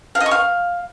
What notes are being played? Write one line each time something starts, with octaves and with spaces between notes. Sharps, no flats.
F5
D#5
C#6
F5